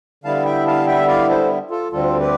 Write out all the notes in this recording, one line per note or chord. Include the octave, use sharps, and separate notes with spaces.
D3 G3 B3 E4 F5 A5
E5 G5
F5 A5
E5 G5
D5 F5
A4 C5
F4 A4
D2 D3 G3 C4 F4 A4
G4 B4